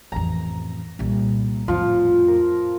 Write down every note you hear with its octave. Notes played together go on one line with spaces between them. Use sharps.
A1 F2 A#5
C2 A#2
F2 A2 F3 F4
A#4